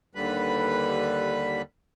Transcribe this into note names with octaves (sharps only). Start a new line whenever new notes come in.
D#2 D3 G3 B4 B5